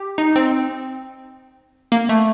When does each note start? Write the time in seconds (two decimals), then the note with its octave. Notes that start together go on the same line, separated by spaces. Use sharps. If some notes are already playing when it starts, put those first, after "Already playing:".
Already playing: G4
0.18 D#4
0.36 C4
1.92 A#3
2.09 A3